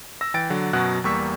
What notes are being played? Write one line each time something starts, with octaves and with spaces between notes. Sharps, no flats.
E6 A#6
E3 G5 A6 D7
D3 F#3
F#2 B2 F#3 F#4 F#6
E2 G3 A#3 C#6 E6 B6